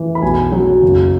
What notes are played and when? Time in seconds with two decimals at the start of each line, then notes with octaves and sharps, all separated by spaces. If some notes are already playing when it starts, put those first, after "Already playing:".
Already playing: E3
0.15 B5
0.22 B1 G#5
0.52 F#3
0.83 F#1